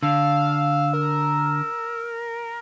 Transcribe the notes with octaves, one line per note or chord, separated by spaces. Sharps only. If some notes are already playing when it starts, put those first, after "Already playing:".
D3 F5 E6
A#4